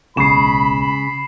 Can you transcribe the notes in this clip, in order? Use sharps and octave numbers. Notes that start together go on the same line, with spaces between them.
D1 B1 C#3 G#3 B5 C7 E7